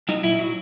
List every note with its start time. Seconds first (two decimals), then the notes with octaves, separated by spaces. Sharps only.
0.09 F#3 D#4
0.23 A#2 E4
0.39 F#3